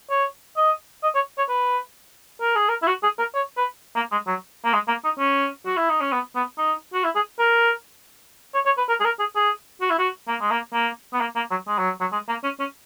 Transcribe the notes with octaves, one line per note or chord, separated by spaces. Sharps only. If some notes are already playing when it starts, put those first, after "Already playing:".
C#5
D#5
D#5
C#5
C#5
B4
A#4
G#4
A#4
E4
F#4
G#4
A#4
C#5
B4
A#3
G#3
F#3
A#3
G#3
A#3
D#4
C#4
F#4
E4
D#4
C#4
B3
B3
D#4
F#4
E4
G#4
A#4
C#5
C#5
B4
A#4
G#4
A#4
G#4
G#4
F#4
E4
F#4
A#3
G#3
A#3
A#3
B3
A#3
A#3
F#3
G#3
F#3
F#3
G#3
A#3
C#4
C#4